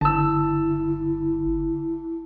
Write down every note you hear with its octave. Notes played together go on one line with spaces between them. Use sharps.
G1 D3 E4 A5 E6